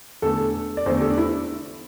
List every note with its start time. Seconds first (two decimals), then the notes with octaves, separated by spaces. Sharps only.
0.22 E2 D3 A3 A4
0.77 D5
0.86 E2 D3 A3 C5
0.98 G4
1.02 A4
1.10 D4
1.18 E4